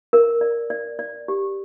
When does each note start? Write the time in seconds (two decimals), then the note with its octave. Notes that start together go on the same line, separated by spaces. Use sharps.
0.13 A#4
0.41 D5
0.70 D5
0.99 D5
1.28 G4